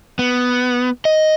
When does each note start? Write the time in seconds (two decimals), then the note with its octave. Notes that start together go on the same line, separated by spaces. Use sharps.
0.19 B3
1.05 D#5